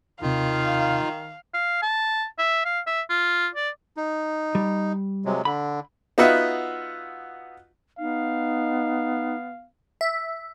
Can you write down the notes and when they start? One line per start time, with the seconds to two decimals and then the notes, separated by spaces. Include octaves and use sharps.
0.22 D#2 C3 D#3 D#4 F4 F5
1.54 F5
1.82 A5
2.38 E5
2.65 F5
2.87 E5
3.10 F4
3.55 D5
3.97 D#4
4.55 G3
5.25 C3 F#3 G#3
5.45 D3 B5
6.18 B3 D#4 F4 F#4 E5 F#5
7.99 B3 D#4 F5
10.01 E5